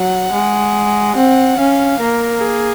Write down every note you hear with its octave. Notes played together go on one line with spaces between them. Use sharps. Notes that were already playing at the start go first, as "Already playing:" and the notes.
Already playing: F#3 F#5
G#3
C4 F#5
C#4 F5
A#3 A#4
G#4